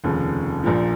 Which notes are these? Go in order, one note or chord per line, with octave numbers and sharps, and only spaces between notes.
F1 D#2 C#3 F3
A#1 A#2 F3